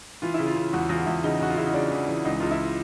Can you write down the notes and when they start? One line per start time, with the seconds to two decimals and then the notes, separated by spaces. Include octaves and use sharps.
0.22 E3 F4
0.34 C#3 E4
0.47 F4
0.56 C#3
0.73 E2 F#4
0.89 E2 F4
1.06 E2 E4
1.23 C#3 D#4
1.40 E2 F#4
1.50 F4
1.57 C#3 E4
1.66 D#4
1.74 C#3 D4
1.91 E3
2.08 E3
2.25 C#2 D#4
2.40 C#2 F4
2.51 E4